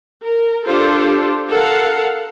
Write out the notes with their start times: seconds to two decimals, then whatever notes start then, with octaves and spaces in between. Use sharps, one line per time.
0.24 A#4
0.65 D4 F4 G4 A4 C5
1.50 A4 A#4 F5 F#5